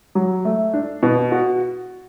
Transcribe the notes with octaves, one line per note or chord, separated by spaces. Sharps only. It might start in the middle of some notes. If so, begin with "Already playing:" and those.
F#3
A3
D4
B2
F#4